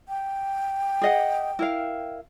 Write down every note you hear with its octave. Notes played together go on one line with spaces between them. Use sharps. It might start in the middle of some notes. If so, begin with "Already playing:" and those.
G5
G#4 D#5 F#5
E4 A#4 F5